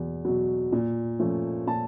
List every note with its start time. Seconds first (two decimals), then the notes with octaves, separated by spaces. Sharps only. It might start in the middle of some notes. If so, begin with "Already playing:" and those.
Already playing: E2 B2 F#3
0.25 B2 F#3
0.72 A#2
1.19 F3 A3 C#4
1.67 A#2 A5